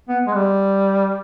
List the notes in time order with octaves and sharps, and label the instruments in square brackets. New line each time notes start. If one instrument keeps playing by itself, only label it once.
[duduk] B3
G#3
G3